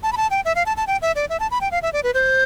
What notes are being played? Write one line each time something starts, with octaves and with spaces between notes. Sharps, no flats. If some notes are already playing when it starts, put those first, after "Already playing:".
A5
B5
A5
G5
E5
F5
A5
A5
G5
E5
D5
E5
A5
B5
G5
F5
E5
D5
B4
C5